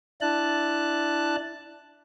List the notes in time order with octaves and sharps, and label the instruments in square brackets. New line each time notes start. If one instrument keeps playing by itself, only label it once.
[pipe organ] D4 E4 A5 F#6